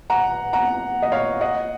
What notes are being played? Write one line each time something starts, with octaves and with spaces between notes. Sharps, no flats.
F#5 A#5
F#5 A#5
D#5
C#5 F5
D#5 F#5